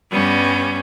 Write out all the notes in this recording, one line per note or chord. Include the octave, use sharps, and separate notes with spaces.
G2 G3 B3 C#4